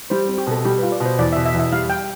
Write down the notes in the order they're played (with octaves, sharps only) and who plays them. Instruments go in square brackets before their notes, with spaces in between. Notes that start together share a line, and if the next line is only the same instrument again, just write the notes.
[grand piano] G3 [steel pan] C5
[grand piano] C4
[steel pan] G4
[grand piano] B2 [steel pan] A4
[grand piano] G3 [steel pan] G4
[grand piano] F4 [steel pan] B4
[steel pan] D5
[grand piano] B2 [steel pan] C5
[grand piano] E2 [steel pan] D5
[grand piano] B2 [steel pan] E5
[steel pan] E5
[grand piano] E2
[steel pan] E5
[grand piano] G3 [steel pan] F5
[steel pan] G5